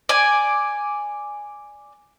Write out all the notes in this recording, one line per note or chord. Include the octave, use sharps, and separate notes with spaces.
D5 G#5